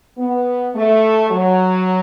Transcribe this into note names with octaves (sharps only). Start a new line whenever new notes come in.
B3
A3
F#3